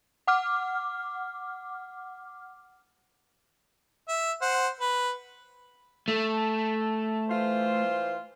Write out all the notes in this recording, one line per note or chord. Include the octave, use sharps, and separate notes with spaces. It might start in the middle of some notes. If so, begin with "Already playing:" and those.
F#5 D6 F6
E5
C5 F#5
B4
A3
E3 F4 C5